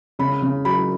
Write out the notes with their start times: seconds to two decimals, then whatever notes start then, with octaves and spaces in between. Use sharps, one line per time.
0.19 C#3 B5
0.42 C#3
0.65 F#3 B5